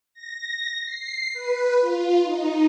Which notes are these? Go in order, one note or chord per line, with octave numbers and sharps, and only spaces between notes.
A#6
C7
B4
F4
D#4